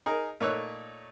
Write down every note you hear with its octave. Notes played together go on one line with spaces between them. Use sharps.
D#4 G#4 A#4
A#2 A3 D#4 C#5 E6 F#6